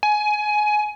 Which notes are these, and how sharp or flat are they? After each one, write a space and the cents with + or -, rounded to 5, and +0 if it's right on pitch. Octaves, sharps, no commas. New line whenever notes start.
G#5 +20